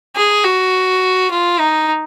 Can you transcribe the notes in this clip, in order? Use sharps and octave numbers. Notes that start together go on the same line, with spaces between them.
G#4
F#4
F4
D#4